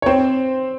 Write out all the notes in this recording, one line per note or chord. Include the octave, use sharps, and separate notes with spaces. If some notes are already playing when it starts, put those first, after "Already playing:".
C#5
C4 C5